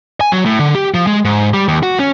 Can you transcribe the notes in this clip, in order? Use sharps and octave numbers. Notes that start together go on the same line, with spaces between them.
G#5
F#3
A2
D3
G4
F3
G#3
G#2
G3
D#2
F#4
C#4